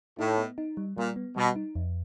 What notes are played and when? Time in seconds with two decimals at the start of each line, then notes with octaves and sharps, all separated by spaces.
0.19 A2 D#4
0.38 B3
0.58 D#4
0.77 G3
0.97 A#2 G3
1.16 B3
1.36 B2 G3
1.56 D#4
1.75 F2